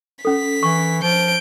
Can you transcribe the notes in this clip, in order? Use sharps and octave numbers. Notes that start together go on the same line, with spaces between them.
C#4 A4 B6
E3 C#6
F3 G6 D7